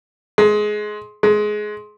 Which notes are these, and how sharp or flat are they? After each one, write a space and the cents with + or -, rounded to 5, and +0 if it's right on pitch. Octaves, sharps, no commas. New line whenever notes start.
G#3 +20
G#3 +20